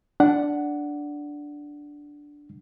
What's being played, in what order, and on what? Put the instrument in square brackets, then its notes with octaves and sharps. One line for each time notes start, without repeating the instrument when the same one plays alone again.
[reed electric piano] D4 F#5